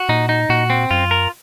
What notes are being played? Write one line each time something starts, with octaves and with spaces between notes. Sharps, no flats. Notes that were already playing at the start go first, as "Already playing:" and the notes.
Already playing: F#4
A#2 D#4
D#4
A#2 F#4
C4
F#2 F4
A#4